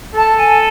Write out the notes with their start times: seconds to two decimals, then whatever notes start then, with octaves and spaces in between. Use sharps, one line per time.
0.15 A4 A5
0.37 G#5